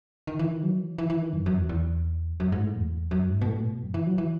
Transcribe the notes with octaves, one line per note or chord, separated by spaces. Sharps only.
D#3
E3
D#3
F#3
E3
E3
E3
D#3
F#2
F#2
E2
E2
F#2
G#2
A2
E2
F#2
G#2
B2
A2
B2
F#2
E3
F#3
E3